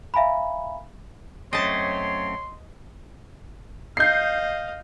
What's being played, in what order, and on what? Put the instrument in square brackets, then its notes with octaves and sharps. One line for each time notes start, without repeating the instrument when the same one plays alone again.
[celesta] E5 F5 G#5 A#5 B5
[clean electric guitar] F#2 A3 C4 [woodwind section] C#5 [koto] D#5 A5 [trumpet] C6
[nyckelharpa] D#5 F5 [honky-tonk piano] G6 C7